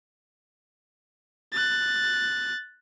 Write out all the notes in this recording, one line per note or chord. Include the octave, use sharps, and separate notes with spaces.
F#6 A6